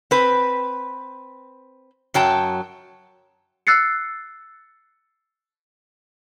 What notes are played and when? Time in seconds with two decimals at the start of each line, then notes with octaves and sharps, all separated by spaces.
0.11 C4 B4
2.14 F#2 F#3 G5 A5
3.67 E6 F#6 A6 C7 C#7